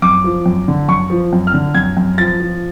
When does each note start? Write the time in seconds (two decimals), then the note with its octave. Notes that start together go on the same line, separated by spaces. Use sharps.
0.02 F#2 D6
0.24 F3
0.46 F#2
0.68 D3
0.88 F#2 C#6
1.10 F3
1.33 F#2
1.47 F6
1.54 D3
1.75 F#2 G#6
1.97 F#2
2.18 F3 A6
2.40 F3